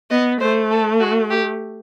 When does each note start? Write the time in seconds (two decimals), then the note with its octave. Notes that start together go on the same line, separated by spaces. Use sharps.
0.10 B3 D#5
0.41 A3 C5
0.71 A4
1.00 F#4
1.30 G4